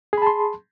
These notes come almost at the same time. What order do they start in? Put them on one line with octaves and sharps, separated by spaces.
G#4 B5 A5 C6